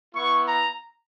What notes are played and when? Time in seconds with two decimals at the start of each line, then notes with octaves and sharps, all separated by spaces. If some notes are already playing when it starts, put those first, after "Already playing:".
0.14 B3 E4 C#6
0.48 A#5